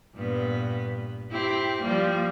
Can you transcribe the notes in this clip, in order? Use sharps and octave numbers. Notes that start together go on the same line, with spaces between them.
G2 A#2 B3
C4 E4 G4
F3 G3 A#3